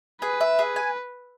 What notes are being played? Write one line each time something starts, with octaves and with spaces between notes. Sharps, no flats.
G#4 B4
E5
G#4
G#5